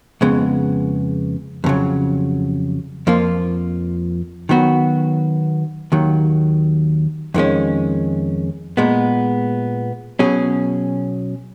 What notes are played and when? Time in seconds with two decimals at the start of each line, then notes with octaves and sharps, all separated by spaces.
0.21 F2 C#3 G#3 B3
1.64 F2 C#3 F#3
3.07 F2 F3 A#3 F4
4.49 D#3 F#3 B3 F#4
5.92 D#2 D#3 F#3
7.34 F2 D#3 G#3 C#4
8.77 A#2 G#3 B3
10.19 B2 F#3 C#4 G#4